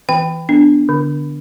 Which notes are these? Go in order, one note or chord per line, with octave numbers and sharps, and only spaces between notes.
E3 G5
B3 D4
D3